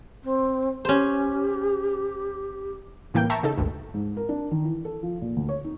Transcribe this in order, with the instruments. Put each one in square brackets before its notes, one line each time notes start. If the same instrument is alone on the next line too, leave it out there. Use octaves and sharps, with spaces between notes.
[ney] C4
[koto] C#4 C5 [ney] G4
[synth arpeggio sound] C2 A2 E3 A#3 G5 G6
E5 G5 A5 A#5 C#6
C#3 D#4 A4
G#1 D2 G2
[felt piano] G#2
A#4
D4
D#3
E3
A4
F3
A#2
D2
C#5
D#4